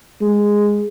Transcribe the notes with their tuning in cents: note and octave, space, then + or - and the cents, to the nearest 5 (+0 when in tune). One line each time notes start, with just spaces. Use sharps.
G#3 -10